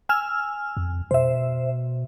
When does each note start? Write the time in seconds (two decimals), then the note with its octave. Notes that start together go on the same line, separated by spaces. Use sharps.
0.09 G#5 E6 F6
0.77 F2
1.11 B2 C5 E5